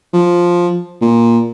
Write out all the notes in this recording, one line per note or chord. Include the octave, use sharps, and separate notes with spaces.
F3
A#2